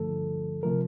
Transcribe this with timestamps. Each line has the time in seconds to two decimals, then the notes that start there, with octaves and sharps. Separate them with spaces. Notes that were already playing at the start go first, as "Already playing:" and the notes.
Already playing: G2 D3 F3 A3 A4
0.63 C3 F3 A3 A#4